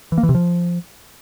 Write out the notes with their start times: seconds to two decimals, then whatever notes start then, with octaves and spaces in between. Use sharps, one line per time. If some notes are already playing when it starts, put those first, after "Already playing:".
0.12 E3
0.18 A#3
0.23 E3
0.29 C3
0.35 F3